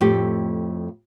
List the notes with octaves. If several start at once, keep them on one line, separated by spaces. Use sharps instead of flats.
F2 A2 A3 G4